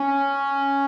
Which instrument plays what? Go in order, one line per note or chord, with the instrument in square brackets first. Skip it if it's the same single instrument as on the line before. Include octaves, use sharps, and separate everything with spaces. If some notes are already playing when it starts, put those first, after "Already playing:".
Already playing: [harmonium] C#4